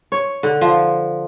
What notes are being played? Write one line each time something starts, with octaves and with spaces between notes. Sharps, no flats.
C#5
D3
F3